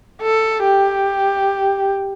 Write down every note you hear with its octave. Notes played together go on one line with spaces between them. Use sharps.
A4
G4